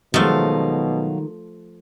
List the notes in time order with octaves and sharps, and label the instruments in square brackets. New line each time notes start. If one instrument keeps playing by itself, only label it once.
[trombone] B2 [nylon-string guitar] D#3 G#3 [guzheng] F3 A3 [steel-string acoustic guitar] F#3 F5